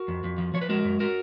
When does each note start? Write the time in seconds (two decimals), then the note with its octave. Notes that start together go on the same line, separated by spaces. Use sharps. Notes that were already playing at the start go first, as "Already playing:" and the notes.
Already playing: F#4 A#4
0.08 F2
0.24 F2
0.38 F3
0.54 F3 C#5
0.61 B4
0.69 G#3 F#4 A#4
0.85 F#2
1.00 F#4 A#4